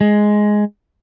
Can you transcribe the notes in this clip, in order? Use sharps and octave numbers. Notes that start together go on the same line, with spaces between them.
G#3